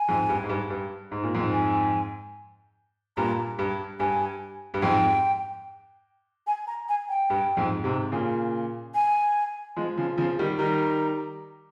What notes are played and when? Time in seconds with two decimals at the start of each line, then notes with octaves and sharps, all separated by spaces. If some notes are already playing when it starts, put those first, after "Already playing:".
Already playing: G#5
0.08 F2 G#2
0.29 G2
0.44 G#2
0.49 G2
0.70 G2
1.11 G#2
1.23 A#2
1.34 F2 G#2
1.52 G#5
3.17 G2 A#2 A#5
3.59 G2
4.00 G2 G#5
4.74 G2
4.82 F2 G#2 G5
6.47 G#5
6.67 A#5
6.89 G#5
7.09 G5
7.30 G2
7.57 F2 G#2
7.84 G#2 C3
8.12 A#2 C#3
8.95 G#5
9.76 F3 G#3
9.97 C#3 F3
10.17 C#3 F3
10.39 D#3 G3
10.59 D#3 G3 A#5